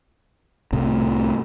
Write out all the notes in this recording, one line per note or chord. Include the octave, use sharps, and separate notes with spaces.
C2 A2 C3